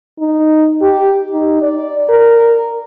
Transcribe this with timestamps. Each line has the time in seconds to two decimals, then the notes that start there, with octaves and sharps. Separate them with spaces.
0.19 D#4
0.82 G4
1.32 D#4
1.62 D5
2.09 A#4